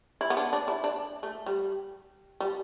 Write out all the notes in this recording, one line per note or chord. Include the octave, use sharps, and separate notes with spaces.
E4
B3
D4
D4
E4
D4
A3
G3
G3